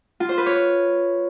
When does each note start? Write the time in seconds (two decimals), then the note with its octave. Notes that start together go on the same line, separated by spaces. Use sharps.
0.20 F4
0.29 C5
0.38 B4
0.46 C#5